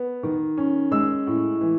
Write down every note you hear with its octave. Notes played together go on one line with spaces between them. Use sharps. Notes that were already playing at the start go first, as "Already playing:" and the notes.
Already playing: B3
D#3
C#4
G#3 E6
A2
E3